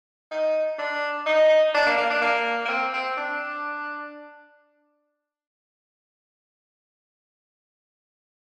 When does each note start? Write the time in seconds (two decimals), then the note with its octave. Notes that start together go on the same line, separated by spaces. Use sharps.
0.31 D#4
0.78 D4
1.26 D#4
1.75 D4
1.86 A#3
1.98 A#3
2.10 D4
2.22 A#3
2.66 A#3
2.70 C4
2.94 C4
3.18 D4